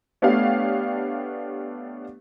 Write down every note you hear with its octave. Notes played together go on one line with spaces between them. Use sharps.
A3 B3 D4 G4 C#5 F5